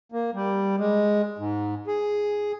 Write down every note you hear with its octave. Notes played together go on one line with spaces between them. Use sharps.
A#3
G3
G#3
G#2
G#4